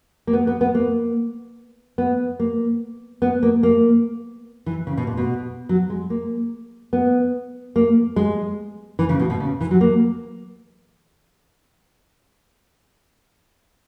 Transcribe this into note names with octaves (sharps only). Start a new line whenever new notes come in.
A#3
B3
B3
B3
A#3
B3
A#3
B3
A#3
A#3
E3
C#3
B2
A#2
B2
F#3
G#3
A#3
B3
A#3
G#3
E3
C#3
B2
B2
C#3
E3
F#3
A#3